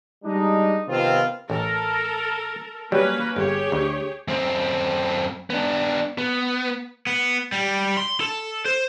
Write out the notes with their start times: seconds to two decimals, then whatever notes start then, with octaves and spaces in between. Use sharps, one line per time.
0.24 G3 G#3 D4 D#4
0.88 C3 D#3 F3 B3 C4 F4
1.50 A1 A4 A#4
2.92 F#3 G3 A#3 C#4 B4
3.36 G1 G4 G#4 C#5
3.72 D2
4.28 F#2 C4
5.50 B3 D4
6.18 B3
7.07 B3
7.52 G3
7.97 C6
8.21 A4
8.66 C5